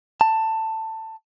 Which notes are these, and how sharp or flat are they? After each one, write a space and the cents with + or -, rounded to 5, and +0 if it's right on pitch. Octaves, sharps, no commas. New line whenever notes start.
A5 +15